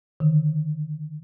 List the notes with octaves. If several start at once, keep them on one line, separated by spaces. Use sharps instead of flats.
D3 D#3